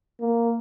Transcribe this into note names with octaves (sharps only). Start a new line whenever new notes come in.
A#3